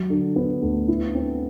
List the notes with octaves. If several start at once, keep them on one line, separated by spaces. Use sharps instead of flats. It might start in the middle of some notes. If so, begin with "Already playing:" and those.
Already playing: F#3
D3
B3
D2
E4
C4